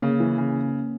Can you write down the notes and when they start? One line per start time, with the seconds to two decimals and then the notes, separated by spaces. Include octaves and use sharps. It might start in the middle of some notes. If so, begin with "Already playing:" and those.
0.02 C#3 A#3 C#4
0.20 E3
0.38 C#3